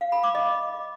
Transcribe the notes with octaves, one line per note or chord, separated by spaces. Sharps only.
F5
B5
D6
D#5